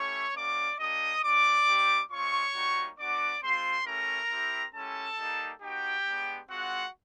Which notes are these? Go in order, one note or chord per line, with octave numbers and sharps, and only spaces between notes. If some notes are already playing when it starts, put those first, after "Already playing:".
Already playing: A3 C#4 E4 G4 C#5 C#6
A#3 C#4 F#4 D5 D6
A#3 D4 G4 D#5 D#6
A3 C#4 F#4 D5 D6
G3 C4 D#4 G4
G#3 C4 F4 C#5 C#6
G3 A#3 D#4 F#4
B3 D4 F#4 D5 D6
G#3 C4 F4 C5 C6
A3 C#4 E4 G4 A#4 A#5
C4 E4 G4
G#3 C#4 E4 G4 A4 A5
G3 A#3 D#4 G4
B3 D#4 F#4 G4 G5
G#3 B3 D4
G#3 C4 F4 F#4 F#5